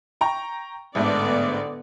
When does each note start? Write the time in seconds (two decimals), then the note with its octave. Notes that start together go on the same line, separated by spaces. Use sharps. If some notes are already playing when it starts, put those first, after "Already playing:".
0.21 G5 A#5 C#6
0.95 A1 G#2 D3 A3 B3 D5